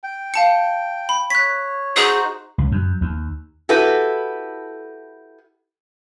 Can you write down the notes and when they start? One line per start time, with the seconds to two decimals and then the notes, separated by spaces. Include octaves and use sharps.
0.03 G5
0.34 F5 A5 C#7
1.09 B5
1.30 C#5 F#6 B6
1.96 D#4 F#4 G#4 C5
2.58 C#2
2.72 F#2
3.01 D#2
3.69 E4 F#4 G4 A4 B4